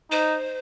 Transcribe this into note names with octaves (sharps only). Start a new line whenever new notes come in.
D#4 C5